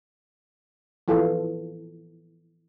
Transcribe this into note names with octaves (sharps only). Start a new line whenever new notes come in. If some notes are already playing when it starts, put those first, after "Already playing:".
E3 F3 F4 A4